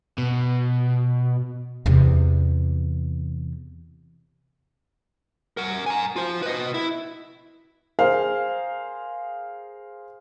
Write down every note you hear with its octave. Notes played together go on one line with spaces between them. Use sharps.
B2
E2 C3
A#4 F#5
G#5 A#5
F4 C5
B4 D#5
E4
G#4 A#4 C5 F5